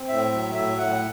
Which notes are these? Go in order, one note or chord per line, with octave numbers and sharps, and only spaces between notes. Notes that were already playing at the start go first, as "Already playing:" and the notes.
Already playing: C4
A2 E5
F#3
A2 E5
A2 F#5